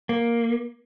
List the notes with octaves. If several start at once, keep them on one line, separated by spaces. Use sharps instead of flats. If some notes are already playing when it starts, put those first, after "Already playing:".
A#3